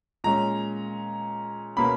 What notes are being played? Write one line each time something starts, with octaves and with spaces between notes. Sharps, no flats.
A#2 G#3 C#4 A#5
B2 A#3 C#4 B5